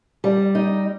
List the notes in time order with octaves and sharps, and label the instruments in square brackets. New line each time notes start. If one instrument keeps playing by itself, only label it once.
[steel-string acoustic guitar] G3
D#4